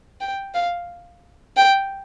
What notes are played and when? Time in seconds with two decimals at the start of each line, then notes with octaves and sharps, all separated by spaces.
0.21 G5
0.55 F5
1.57 G5